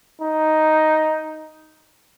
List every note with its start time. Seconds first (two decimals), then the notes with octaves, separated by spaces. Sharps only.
0.22 D#4